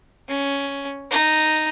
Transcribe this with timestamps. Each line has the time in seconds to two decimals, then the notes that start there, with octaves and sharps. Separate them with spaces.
0.28 C#4
1.10 D#4